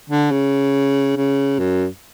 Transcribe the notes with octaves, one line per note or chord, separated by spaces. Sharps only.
D3
C#3
C#3
F#2